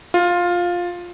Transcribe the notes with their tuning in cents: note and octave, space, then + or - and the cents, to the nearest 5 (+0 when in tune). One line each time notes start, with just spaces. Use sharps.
F4 +10